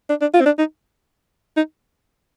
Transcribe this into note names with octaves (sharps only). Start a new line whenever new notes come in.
D4
D4
F4
C4
D4
D#4
D#4